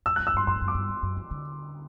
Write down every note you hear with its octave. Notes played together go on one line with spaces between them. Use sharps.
F#2 E6
F#6
G2
E6
G2 C6
F#2 C6
G2
F#2
D6
G2
E2
F#2
E3
D3